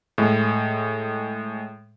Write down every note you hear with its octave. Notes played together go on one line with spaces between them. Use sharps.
A2 G#3